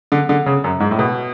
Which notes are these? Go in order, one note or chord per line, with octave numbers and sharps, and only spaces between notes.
D3
D3
C#3
F#2
G#2
A2
B2